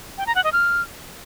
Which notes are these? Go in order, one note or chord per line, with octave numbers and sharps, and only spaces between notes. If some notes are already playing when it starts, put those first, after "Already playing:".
G5
A#5
F#5
D#5
F6